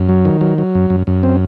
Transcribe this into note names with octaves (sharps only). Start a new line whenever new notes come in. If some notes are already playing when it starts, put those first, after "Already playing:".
Already playing: F#2
F#3
D#3
F#3
F#3
F#2
F#2
F#2
C4